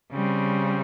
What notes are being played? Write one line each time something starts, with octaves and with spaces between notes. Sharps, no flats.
C#3 G3 C4